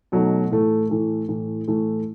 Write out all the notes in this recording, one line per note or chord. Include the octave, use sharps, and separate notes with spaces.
B2 F#3 A3 D#4
A2 E3 A3
A2 E3 A3
A2 E3 A3
A2 E3 A3